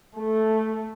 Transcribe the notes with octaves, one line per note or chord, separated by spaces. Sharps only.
A3